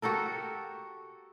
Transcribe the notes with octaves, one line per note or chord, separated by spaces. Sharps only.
F#4 G4 A4 A#4